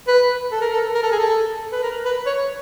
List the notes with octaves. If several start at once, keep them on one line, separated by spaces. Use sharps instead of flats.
B4
A4
A#4
A4
A#4
A4
G#4
A4
B4
A#4
B4
C#5